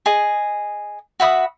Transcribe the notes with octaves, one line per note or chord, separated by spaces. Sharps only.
G#4 D#5
F#4 E5 B5 D#6